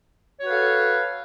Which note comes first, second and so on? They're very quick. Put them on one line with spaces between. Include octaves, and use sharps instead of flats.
C#5 F#4 B4 F5 A4